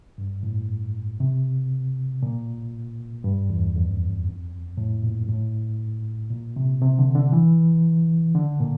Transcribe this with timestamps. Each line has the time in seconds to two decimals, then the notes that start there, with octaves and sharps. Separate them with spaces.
0.18 G2
0.43 A2
1.20 C3
2.23 A#2
3.24 G2
3.50 E2
3.75 F2
4.77 A2
5.03 A#2
5.23 G2
5.29 A2
6.30 A#2
6.56 C3
6.82 C3
6.99 D3
7.15 D3
7.33 E3
8.35 D3
8.60 A#2